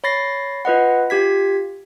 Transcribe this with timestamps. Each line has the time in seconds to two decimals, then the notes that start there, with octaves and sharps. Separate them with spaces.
0.04 C#5 B5 A6 A#6 C7
0.65 F4 B4 D#5 F#5
1.10 F4 G4 G#6 B6